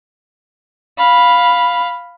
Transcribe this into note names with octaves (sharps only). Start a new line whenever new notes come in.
F5 B5